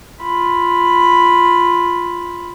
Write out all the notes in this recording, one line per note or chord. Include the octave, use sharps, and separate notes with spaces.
F4 B5